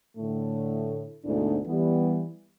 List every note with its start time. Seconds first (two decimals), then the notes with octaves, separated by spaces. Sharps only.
0.17 A2 D3 A3
1.25 D2 G#2 B2 A3 D4 E4
1.67 E3 G3 B3